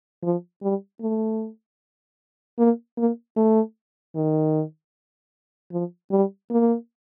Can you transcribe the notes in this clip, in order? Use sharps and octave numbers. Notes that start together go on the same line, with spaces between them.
F3
G3
A3
A#3
A#3
A3
D#3
F3
G3
A#3